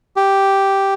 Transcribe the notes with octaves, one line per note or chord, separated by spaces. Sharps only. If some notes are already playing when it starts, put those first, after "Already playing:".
G4